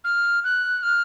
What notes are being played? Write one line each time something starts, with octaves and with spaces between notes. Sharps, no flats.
F6
F#6
F6